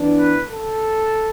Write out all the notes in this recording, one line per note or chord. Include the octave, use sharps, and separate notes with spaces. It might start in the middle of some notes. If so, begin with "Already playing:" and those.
Already playing: E3 B3 D4
B4
A4